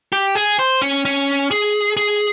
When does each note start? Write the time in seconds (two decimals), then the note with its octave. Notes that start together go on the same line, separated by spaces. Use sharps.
0.13 G4
0.35 G#4
0.59 C5
0.81 C#4
1.05 C#4
1.51 G#4
1.97 G#4